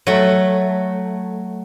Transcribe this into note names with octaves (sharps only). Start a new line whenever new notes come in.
F#3 A3